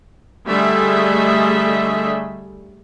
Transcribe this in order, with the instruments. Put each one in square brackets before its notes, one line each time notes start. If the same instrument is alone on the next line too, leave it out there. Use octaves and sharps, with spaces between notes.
[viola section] D3 G3 A3 G#4 D#5 E5